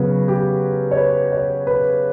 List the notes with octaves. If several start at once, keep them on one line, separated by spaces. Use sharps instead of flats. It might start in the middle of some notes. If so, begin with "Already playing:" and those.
Already playing: C#3 F#3 B3 B4
G4
C#5
B4
C#5
B4